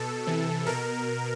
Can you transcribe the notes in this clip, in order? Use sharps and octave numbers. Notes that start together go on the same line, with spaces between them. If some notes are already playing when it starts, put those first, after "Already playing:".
Already playing: B2 A4
C3 E3
B2 A#4